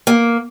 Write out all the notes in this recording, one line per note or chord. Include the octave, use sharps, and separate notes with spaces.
A#3